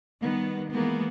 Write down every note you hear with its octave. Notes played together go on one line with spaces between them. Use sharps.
D#3 G3 B3
E3 G#3 A#3 B3